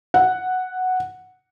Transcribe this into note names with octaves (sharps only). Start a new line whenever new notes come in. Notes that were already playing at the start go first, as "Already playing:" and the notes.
F#5